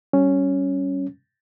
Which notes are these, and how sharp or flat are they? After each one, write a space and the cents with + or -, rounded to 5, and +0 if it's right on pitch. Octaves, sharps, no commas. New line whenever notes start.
G3 -25 C#4 +0